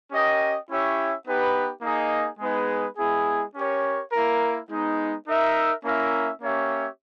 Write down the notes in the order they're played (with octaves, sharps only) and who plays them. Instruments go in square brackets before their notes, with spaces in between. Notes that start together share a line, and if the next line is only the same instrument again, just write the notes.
[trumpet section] C#4 G4 A#4 D#5 G5
C#4 E4 G4 C#5 E5
B3 D#4 G4 B4
A#3 D#4 G#4 D#5
G#3 B3 D#4 G#4 B4
G#3 B3 E4 G#4
C#4 G4 A#4 C#5
A#3 E4 A#4
G#3 B3 D#4
D#4 A#4 E5
A#3 C#4 E4 A#4 E5
A#3 C#4 G4 C#5 E5